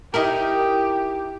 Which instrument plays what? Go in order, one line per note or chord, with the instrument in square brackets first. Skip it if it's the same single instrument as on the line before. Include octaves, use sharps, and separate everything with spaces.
[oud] D#4 E4 A#4 [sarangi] G4